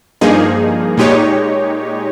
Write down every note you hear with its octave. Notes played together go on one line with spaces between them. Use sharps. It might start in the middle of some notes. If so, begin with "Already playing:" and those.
G2 F3 A#3 D#4 G#4
A#2 G#3 D#4 G4 C#5